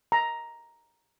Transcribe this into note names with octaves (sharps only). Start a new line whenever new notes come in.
A#5